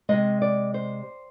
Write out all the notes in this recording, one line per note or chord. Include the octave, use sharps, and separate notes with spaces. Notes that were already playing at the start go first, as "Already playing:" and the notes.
C3 F3 G#3 D#5
D5
C5